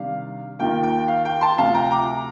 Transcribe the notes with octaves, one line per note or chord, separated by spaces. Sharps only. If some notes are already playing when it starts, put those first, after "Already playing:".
Already playing: C3 D#3 G3 D4 F5
D#2 D#3 A#3 F4 G5
G5
F5
G5
A5 C6
D2 C3 F3 F5 A5
G5 A#5
A#5 D6